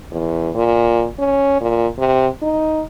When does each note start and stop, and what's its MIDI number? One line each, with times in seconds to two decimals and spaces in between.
0.12 0.50 40
0.55 1.06 46
1.19 1.56 61
1.61 1.87 46
1.98 2.28 48
2.42 2.83 63